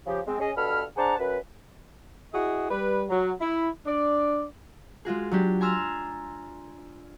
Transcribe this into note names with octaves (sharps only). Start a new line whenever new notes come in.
C#3 F3 G4
G#3 C4
C#4 G#4 D#5
G2 B2 A4 B5 F6
D4 G#4 C5 F#5 A5 A#5
F#2 B4
E4 F#4 G#4 D#5
G3 B4
F#3
E4
D4 D5
G#3 F4 F#4 G#4
F#3 D4 G4
G#5 A#5 C6 E6 F6 A6